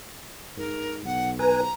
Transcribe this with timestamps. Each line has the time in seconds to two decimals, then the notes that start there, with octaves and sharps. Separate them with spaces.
0.57 G#2 A#4
1.05 B1 F#5
1.39 B4 G#5 A#5